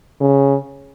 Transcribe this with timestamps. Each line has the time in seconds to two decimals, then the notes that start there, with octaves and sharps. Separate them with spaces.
0.21 C#3